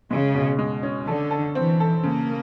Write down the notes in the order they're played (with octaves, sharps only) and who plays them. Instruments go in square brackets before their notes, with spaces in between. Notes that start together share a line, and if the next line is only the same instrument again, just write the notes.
[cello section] C#3 [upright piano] G#3
[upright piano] B2
G#3
C#4
[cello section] D3 [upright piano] A4
[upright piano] A4
[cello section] E3 [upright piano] C4
[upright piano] A4
[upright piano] C#3 [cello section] A#3